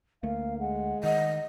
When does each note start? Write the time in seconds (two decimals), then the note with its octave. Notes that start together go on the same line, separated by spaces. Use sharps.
0.23 D2 A3 A#3 F5
0.60 G#3 F#5
1.03 D#3 D#5 F#5